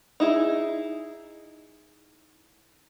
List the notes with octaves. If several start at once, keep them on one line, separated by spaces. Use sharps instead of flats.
D#4 E4 G#4